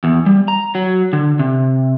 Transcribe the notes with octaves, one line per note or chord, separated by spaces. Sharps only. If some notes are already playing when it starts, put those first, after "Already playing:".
E2
G3
A#5
F#3
D3
C3